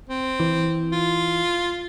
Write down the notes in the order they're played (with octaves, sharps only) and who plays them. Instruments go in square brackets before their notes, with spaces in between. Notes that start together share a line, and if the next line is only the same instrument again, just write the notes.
[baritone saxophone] C4
[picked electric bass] E3
[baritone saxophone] F4